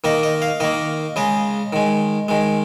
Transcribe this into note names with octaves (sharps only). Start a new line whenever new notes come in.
D#3 A#3 D#5
D#5
F5
D#3 A#3 D#5
C#3 G#3 D#5
D#3 G#3
D#3 G#3